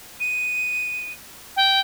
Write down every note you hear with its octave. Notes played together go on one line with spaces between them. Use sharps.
D#7
G5